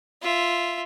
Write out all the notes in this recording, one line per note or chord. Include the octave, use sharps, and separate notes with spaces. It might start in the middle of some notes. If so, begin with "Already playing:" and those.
F4 E5